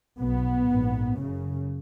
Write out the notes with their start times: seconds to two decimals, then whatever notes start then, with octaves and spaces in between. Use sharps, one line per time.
0.17 B1 B2 B3
0.67 A#1 G#2
1.17 F#1 F#2 C#3